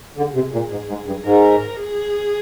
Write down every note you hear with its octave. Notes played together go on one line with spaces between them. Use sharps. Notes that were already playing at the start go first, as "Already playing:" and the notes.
D3 G#4
C3
A#2
G#2
G#2
G2
G#2 A#4
G#4